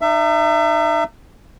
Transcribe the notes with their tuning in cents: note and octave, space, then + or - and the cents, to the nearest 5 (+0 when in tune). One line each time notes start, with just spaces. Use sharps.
D#4 -30 E5 +25